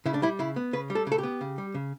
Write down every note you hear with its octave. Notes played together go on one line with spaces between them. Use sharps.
C#3 E4
D4
G3 E4
C#3 E4
B3
C#3 B4
G3
A4
C#3
A4
G4
B3
C#3
G3
C#3